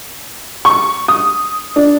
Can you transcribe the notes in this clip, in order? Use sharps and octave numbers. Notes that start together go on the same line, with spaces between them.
C#6
D#6
D4